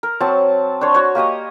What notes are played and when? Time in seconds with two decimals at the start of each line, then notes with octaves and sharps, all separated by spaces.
0.03 A#4
0.20 F#3 C4 A5
0.81 D4 C5 C#5
0.94 F#4 C#5
1.15 A#3 G4 D#5 D#6